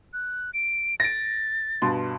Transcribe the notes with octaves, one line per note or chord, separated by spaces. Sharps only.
F#6
D7
A6 A#6 D7
G2 B2 C6